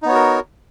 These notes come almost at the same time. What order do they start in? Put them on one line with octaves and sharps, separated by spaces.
D#4 B3 C#5 F#4 A#4